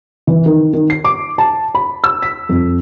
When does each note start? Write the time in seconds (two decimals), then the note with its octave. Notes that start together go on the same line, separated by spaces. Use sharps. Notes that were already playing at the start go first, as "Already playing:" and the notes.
0.27 E3
0.46 D#3
0.73 D#3
0.90 C7
1.05 D6
1.38 A5
1.75 B5
2.04 E6
2.22 B6
2.49 F2